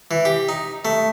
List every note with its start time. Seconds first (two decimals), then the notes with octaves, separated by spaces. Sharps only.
0.11 E3
0.25 G4
0.49 D#4
0.85 A3